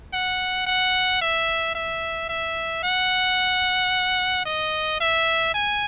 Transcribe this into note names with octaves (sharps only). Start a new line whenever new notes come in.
F#5
F#5
E5
E5
E5
F#5
D#5
E5
G#5